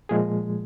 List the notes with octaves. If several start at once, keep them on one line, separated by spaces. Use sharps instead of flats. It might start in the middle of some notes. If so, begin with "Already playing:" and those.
A#2 F3 G#3 G#4